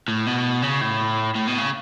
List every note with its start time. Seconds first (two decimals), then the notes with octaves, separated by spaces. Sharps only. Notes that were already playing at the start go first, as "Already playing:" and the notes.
0.08 A2
0.26 B2
0.62 C#3
0.81 A2
1.35 A2
1.47 B2
1.58 C#3